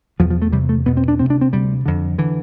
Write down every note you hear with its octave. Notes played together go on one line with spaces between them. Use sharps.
E2 B2 F3
F3
A3
E2 C3 G3
A3
E2 B2 B3
C4
D4
D2 C3 C4
D4
C4
D2 C3 G3
F2 D3
D3 E3